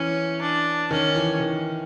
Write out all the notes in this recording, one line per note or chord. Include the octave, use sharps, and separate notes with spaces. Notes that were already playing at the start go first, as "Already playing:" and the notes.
Already playing: E3 C#4
D4
D#3 C#4
E3
D#3